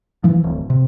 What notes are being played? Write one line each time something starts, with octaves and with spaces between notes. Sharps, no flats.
E3 F3
D1
C3